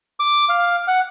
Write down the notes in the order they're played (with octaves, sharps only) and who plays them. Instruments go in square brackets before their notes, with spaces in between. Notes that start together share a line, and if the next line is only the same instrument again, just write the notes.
[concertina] D6
F5
F#5